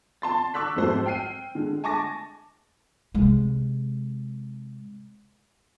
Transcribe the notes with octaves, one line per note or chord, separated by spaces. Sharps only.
A5 C6 A6
C#6 D6 E6 F#6 B6
F2 G#2 F#3 A3 C5
G5 F6 C7 D#7
D3 G#3
G#5 A5 C#6 D6 A6 A#6
C3 G#3